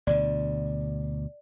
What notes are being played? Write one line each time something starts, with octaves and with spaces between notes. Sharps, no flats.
D2 B2 D3 D5